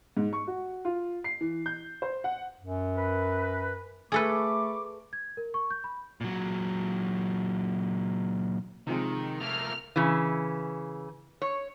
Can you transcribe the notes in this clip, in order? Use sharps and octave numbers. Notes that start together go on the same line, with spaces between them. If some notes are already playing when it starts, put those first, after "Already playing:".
G#2
C#6
F#4
F4
C7
E3
G6
C5
F#5
F#2
A#4 B4
A3 G#4 A4 B4 B5 C#6 D6
G#6
A#4
C#6
G6
B5
A#2 F#3
C3 D#3 F3 G#3
A3 A#3 F6
C#3 E3
C#5